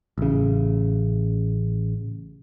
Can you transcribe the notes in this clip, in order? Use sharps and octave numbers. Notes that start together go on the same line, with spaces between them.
A1 C#3